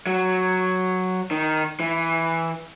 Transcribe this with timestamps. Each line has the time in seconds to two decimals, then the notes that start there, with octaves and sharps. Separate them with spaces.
0.07 F#3
1.31 D#3
1.80 E3